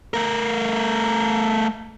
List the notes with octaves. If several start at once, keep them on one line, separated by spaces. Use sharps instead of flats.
A3 A#4